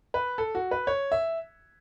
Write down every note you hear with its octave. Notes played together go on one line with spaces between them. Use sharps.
B4
A4
F#4
B4
C#5
E5